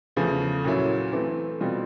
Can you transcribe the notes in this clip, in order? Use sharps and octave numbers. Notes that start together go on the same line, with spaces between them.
E2 C#3 F3 A3
A#2 F#3 A#3 C#4 E4
E3 A3 C4
B2 G3 C4 F4